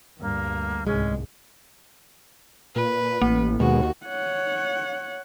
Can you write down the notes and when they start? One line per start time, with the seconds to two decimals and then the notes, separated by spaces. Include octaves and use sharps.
0.20 D2 G2 A#3
0.87 C2 G#2 G#3 C#4
2.76 A#2 B4
3.22 A1 A#3
3.60 D#2 B2 G#3 F#4
4.06 C#5 F#5